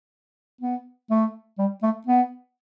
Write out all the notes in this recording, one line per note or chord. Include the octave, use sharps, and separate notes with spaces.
B3
A3
G3
A3
B3